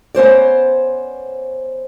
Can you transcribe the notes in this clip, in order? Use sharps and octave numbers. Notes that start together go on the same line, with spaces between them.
B3 C#4 C5 D5